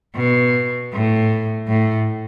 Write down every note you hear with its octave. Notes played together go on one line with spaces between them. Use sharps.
B2
A2
A2